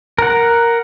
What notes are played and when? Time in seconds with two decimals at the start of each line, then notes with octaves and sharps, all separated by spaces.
0.18 A#4 F#5